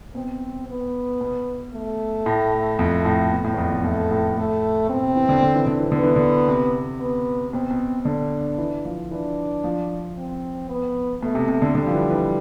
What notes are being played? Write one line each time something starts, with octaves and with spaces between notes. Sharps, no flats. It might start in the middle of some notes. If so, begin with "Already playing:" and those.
B2 C4
B3
B2
A3
A2
F2
A2
B2
A2
E2
F2
E2
F2 A3
A2
A2 A3
B2 C4
C3
E3
D3
D3
E3
D3
E3
D3 B3
E3
D3
C3
B3
B2 C4
B2
D3 D4
E3
F3
E3 D4
F3
C4
B3
B2 A3
C3
C3
D3
D3 G3
F3
E3
E3